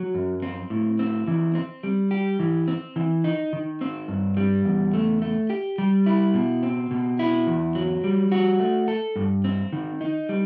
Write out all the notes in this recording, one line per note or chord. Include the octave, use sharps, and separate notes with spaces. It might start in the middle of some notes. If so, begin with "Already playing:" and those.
Already playing: F#3
F#2
C4
A2
C4
E3
C4
G3
G4
E3
C4
E3
D#4
D#3
C4
G2
G3
E2
A3
A3
G4
G3
E4
B2
C4
B2
E4
E2
F#3
G3
F#4
A3
A4
G2
C4
D#3
D#4
G3